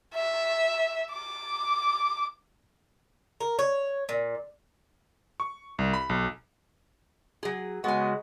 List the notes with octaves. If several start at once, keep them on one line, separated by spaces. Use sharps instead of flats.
E5
D6
A#4
C#5
A#2
C#6
C2
B5
B1
F#3 G#4
C#3 G#3 B3 F#4 G#5